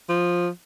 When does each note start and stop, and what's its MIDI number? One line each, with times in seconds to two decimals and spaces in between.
0.09 0.48 53